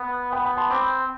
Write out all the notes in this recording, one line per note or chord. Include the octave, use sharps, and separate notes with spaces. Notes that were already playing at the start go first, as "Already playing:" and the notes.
Already playing: B3
B3 G5 B5
G5 B5
A5 C6
C4 B5 D6